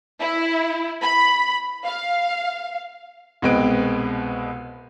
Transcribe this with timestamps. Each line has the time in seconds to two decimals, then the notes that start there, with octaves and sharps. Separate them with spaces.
0.21 E4
1.02 B5
1.85 F5
3.42 C2 B2 G#3 C4 B4 D7